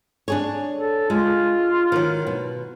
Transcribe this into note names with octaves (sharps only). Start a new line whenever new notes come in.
D4 G#4 C#5
A4
G#3 F4
D#3 F#3
B2